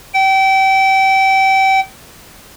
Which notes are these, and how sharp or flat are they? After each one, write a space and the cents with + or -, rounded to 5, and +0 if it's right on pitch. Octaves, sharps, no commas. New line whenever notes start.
G5 -30